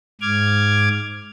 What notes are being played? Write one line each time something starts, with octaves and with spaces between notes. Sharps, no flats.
G#2 D6 F6 G#6